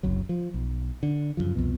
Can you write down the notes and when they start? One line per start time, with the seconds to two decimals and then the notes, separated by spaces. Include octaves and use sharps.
0.03 F#1 C2 F#3
0.29 F3
0.54 B1
1.03 D3
1.37 F#2 A2 C#3 F3
1.55 C2 F2 B2